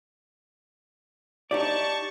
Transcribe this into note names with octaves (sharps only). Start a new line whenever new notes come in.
D#4 G4 D5 A5 C#6